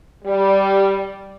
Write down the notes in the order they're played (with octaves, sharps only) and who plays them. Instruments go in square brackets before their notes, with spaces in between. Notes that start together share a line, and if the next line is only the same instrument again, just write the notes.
[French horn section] G3